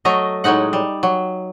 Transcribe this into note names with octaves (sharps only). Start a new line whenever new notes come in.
F#3 A3 D#5 A#5
A2 F#3 G#3 D#4 F#5
G3
F#3